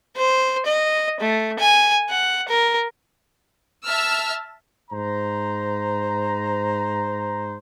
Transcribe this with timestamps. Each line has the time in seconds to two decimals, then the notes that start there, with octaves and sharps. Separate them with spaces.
0.16 C5
0.66 D#5
1.21 A3
1.59 G#5
2.10 F#5
2.48 A#4
3.86 E5 A5 E6 F6
4.91 G#2 C5 A#5